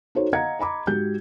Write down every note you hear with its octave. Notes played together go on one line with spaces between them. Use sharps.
D#4 F#4 A4 C5 C#5
D#5 F5 F#5 A#5 G#6 C#7
D#5 A#5 B5 D6
G#2 F#4 G4 G6